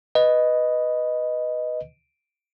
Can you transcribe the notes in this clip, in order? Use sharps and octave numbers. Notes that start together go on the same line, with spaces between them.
B4 D#5